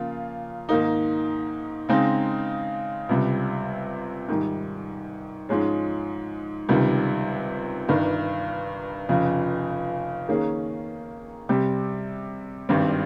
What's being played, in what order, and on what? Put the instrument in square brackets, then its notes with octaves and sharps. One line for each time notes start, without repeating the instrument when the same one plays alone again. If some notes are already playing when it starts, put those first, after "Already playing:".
Already playing: [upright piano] C#3 F3 A#3 F4
G#2 D#3 A#3 D#4
C#3 G#3 C4 D#4
C#2 C3 G3
G#2 D#3 G3
G#2 F3 G#3 C#4 G#4
C#2 C3 D#3 G3
G1 G2 D#3
F1 F2 C#3
D#3 A#3 C#4 G#4
C3 G3 C4 G4
G#1 G2 G3 C4